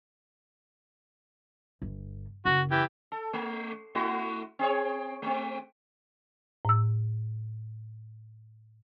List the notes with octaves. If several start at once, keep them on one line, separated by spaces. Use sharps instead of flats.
G1
F#1 F#4
E3 G4
A4
A3
A3 E4 F#4
C4 G#4 C#5
A3 C4
A2 E6